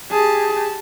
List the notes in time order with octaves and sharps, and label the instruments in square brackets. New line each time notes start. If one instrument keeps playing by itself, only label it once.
[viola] G4 A5 [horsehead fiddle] G#4